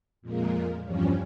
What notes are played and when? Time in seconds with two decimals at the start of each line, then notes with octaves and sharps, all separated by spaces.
0.22 F2 A#2 G#3 A#3
0.84 E2 G2 F3 G3 C#4